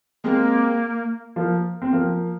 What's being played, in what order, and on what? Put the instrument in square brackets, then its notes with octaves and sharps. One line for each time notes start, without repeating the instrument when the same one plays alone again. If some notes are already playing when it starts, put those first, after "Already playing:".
[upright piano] G#3 C4 [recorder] A#3
[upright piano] F3 A#3
C4
F3 A#3